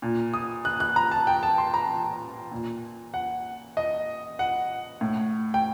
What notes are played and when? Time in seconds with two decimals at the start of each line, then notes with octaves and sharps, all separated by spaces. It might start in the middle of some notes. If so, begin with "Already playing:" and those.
0.02 A#2
0.34 D#6
0.65 F#6
0.80 F#6
0.96 A#5
1.12 A5
1.27 G5
1.43 A5
1.58 C6
1.74 A#5
2.52 A#2
3.14 F#5
3.77 D#5
4.39 F#5
5.01 A2
5.54 G5